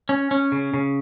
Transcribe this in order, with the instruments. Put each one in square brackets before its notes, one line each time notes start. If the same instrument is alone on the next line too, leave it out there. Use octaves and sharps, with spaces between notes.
[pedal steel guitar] C#4
C#4
C#3
C#3